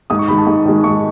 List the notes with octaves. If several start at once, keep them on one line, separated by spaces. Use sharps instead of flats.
G#2 D#6
C#6
D#3 G#3 B5
A5
G#2
D#3 G#3
G#2 C#6